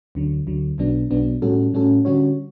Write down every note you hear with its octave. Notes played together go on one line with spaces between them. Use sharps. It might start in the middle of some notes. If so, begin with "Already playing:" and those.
D2 D3 F#3
D2 D3 F#3
B1 B2 F#3 B3 D4
B1 B2 F#3 B3 D4
A2 G3 C#4 F#4 A4
A2 G3 C#4 F#4 A4
D3 G3 C#4 F#4 C#5